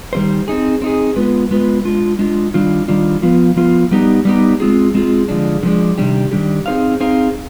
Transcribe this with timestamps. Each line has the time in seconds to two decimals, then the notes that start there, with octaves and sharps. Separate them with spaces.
0.13 D#3 G3 C4 F4 C5
0.48 C4 D#4 G#4
0.82 C4 D#4 G#4
1.16 G#3 B3 F4 B4
1.51 G#3 B3 F4 B4
1.85 G#3 D4 F4
2.19 G#3 D4 F4
2.54 D#3 G3 D4 F4
2.88 D#3 G3 D4 F4
3.22 F3 B3 F4
3.56 F3 B3 F4
3.91 G3 B3 D#4 G4
4.25 G3 B3 D#4 G4
4.60 G#3 C4 F4 G#4
4.94 G#3 C4 F4 G#4
5.29 D3 F3 G#3 D4
5.63 D3 F3 G#3 D4
5.98 C3 D#3 G3 D4 G4
6.32 C3 D#3 G3 D4 G4
6.66 C4 D#4 G#4 C5 F5
7.00 C4 D#4 G#4 C5 F5